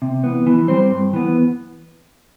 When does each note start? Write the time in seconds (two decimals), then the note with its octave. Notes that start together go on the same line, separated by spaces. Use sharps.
0.02 C3
0.24 E3 B3
0.47 E3
0.68 G3 C4 G4 C5
0.91 G2
1.13 E3 B3